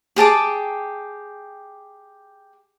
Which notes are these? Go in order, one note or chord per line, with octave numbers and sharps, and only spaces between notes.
G4 G#4 A5 D6